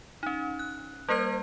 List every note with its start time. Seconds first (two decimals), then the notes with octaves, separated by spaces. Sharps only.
0.23 C#4 D#4
0.59 F#6
1.09 G3 A#3 A#4 C5 G#6